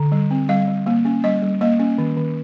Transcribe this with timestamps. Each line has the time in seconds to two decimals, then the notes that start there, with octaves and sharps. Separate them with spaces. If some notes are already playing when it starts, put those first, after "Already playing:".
Already playing: D3
0.12 G3
0.31 C4
0.49 G3 F5
0.68 G3
0.86 A#3
1.05 C#4
1.24 G3 D#5
1.42 G3
1.61 A#3 D#5
1.80 C#4
1.98 D#3
2.17 D#3